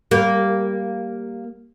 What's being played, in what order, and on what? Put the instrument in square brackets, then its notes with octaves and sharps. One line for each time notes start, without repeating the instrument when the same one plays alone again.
[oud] G3 A#3